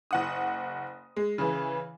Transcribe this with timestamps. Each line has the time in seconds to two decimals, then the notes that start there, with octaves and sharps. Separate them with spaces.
0.11 F#1 F#5 D#6
1.17 G#3
1.38 C#3 E3